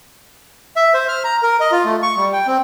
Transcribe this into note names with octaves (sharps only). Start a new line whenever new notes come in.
E5
C5
F6
A#5
A#4
D#5
F4
A3
C#6
G3
G5
C4